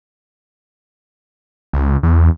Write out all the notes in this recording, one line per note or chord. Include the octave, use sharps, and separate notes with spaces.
C#2
E2